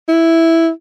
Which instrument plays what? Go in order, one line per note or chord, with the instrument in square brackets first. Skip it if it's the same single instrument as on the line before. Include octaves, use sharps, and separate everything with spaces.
[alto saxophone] E4